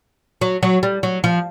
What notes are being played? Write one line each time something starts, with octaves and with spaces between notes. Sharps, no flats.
F#3
F#3
G3
F#3
F3